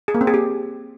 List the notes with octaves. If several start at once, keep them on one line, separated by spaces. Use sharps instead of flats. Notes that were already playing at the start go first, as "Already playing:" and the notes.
G#4
A#3
C4
G#4
G4